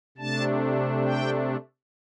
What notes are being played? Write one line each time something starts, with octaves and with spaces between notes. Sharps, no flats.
C3 A3 D4 A5
G5